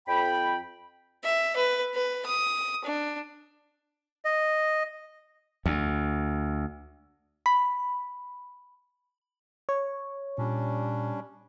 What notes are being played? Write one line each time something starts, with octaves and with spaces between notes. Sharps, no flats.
F2 G5 B5
E5
B4
B4
D#6
D4
D#5
D2
B5
C#5
A#2 G3 C#4 D4